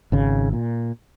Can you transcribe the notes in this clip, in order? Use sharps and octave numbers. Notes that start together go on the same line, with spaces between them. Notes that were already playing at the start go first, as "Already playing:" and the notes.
G#1 C#3
A#2